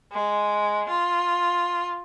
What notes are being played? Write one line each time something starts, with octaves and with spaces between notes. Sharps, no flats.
G#3
F4